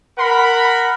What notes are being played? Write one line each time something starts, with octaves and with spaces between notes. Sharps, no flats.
A#4 F#5 B5